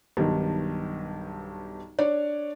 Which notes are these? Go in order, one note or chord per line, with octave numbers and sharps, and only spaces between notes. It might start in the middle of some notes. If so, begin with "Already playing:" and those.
B1 G2 D#3
D4 C#5 D5